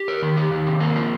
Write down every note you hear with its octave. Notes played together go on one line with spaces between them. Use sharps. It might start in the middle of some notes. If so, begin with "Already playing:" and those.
Already playing: G4
A#4
D#3
G4
D#3
C3
A#3
F3